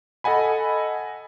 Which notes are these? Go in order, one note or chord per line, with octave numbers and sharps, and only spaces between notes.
A4 D#5 F#5 G#5 B5